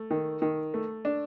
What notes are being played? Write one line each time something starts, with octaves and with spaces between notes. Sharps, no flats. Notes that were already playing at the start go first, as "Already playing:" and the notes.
Already playing: A3
D#3
D#3
A3
D4